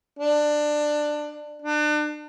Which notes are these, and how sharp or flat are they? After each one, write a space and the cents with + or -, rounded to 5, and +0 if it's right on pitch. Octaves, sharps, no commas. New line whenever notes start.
D4 +20
D4 +35